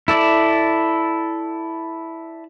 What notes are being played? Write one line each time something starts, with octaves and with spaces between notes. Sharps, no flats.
E4 A4 D5